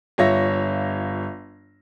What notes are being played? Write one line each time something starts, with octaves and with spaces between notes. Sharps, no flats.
G1 F4 C#5 E5 A#6